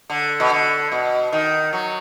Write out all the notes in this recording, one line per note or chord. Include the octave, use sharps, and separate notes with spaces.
D3
B2
D3
B2
D#3
F#3